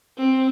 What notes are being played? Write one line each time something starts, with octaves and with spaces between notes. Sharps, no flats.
C4